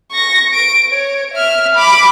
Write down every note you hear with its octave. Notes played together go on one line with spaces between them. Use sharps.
C#6 A#6
D7
C#5
E5 F6
B5 D6